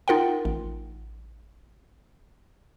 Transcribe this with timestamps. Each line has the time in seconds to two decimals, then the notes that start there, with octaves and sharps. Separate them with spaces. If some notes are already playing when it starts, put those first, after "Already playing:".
0.08 D#4 F4 A#4 F#5 G5
0.45 A1